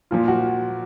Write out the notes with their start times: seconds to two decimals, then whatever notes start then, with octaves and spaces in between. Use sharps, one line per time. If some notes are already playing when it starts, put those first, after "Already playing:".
0.11 A#2 F3 F4
0.28 F#4